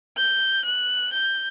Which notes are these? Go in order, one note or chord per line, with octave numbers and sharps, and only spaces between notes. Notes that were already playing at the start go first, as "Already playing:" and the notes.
G6
F#6
G6